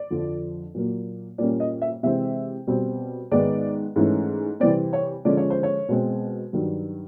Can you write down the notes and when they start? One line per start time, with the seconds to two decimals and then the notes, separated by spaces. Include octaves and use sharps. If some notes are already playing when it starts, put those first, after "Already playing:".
Already playing: D5
0.11 F2 D3 F3
0.74 A#2 F#3 A#3
1.38 A#2 G3 A#3 C#4 D5
1.60 D#5
1.82 E5
2.03 C3 E3 G#3 C4 E5
2.67 B2 G3 C4
3.31 G#2 D#3 G#3 B3 D5
3.96 G#2 E3 A3 C#4
4.60 C3 E3 G3 C4 D5
4.93 C#5
5.25 D3 F3 G#3 C#4 D5
5.37 C#5
5.50 C5
5.63 C#5
5.89 B2 G#3 C4
6.53 G2 D#3 F#3